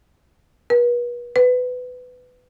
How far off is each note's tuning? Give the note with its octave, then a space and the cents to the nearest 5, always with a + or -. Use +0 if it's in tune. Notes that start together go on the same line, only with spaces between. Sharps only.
B4 -40
B4 +20